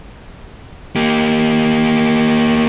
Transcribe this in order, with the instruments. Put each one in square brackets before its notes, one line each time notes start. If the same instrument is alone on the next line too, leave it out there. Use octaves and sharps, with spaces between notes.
[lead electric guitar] A#3 G4